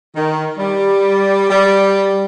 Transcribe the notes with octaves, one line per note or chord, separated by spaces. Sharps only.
D#3
G3
G3